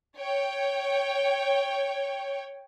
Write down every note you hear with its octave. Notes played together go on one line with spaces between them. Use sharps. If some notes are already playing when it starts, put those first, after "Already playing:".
C#5 G5